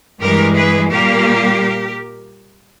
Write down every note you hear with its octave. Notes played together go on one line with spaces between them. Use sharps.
G2 E3 G#3 G4 A#4
G#4 B4
A#2 G3 A#3 G4 A#4